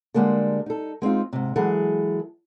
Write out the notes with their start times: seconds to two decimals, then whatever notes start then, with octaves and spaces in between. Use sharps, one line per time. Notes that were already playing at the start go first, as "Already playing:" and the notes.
0.14 D3 G3 G#3 A#3 A4
0.66 D#4 A4
1.02 G#3 C4 D#4 F4
1.33 G#2 C3
1.56 E3 F#3 G#3 G#4 A4